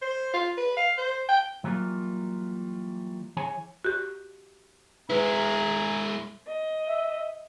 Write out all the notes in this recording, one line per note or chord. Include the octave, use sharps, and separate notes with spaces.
C5
F4
B4
F5
C5
G5
E3 F#3 G3 A#3 F4
E3 G#4 C#5 G#5
F#4 G4
G#3 E4 G#4 B4 A#5
D#5
E5